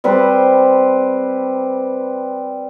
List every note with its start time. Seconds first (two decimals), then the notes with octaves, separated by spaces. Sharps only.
0.04 G3 C4 B4 C5